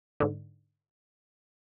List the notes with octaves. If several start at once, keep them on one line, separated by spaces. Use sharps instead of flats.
G#2 D3